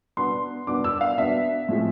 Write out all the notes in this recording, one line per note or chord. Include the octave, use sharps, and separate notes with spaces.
B2 B3 D4 C6
B2 B3 D4 D6
E6
F5
B2 B3 D4 E5
A2 F3 G#3 C4